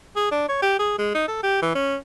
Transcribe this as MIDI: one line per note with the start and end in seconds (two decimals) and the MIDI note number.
0.16 0.28 68
0.31 0.44 62
0.48 0.61 73
0.62 0.77 67
0.79 0.95 68
0.98 1.11 56
1.14 1.27 63
1.28 1.41 69
1.43 1.62 67
1.62 1.73 52
1.75 1.96 61